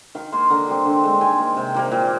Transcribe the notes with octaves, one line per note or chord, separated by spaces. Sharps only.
D#3 F5
A#3 C6
D3 A#5
G3 C4
D3
G#3 C4
D#3 G#5
A#3
C3 G5
D#3 G3 A#3
A#2